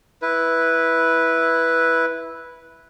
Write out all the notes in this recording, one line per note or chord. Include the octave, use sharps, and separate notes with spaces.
E4 B4